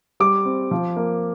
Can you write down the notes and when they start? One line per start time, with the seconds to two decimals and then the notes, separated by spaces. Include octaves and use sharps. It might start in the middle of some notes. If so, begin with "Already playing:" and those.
0.20 G3 D6
0.45 C4
0.71 F3
0.96 A#3